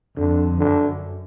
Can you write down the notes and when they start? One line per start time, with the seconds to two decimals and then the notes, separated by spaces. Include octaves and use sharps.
0.17 F2 D3
0.58 F#2 D3